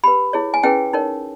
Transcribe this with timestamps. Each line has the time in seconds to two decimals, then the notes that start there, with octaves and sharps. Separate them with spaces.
0.04 G4 B4 B5
0.33 E4 G#4 C#5
0.54 G#5
0.63 C#4 E4 G#4 B4 G5
0.93 D#4 A#4 C#5